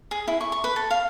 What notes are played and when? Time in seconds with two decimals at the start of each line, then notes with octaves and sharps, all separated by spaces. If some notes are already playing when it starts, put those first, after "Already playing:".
0.11 G#4
0.28 E4
0.41 C#6
0.52 C#6
0.64 B4
0.76 A4
0.91 F5